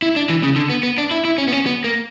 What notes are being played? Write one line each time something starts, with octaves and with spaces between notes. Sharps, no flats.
E4
D4
E3
C#3
D3
B3
B3
D4
E4
E4
C#4
B3
C#4
B3
A#3